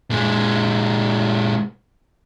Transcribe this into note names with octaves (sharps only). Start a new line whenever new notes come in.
A#2 G#3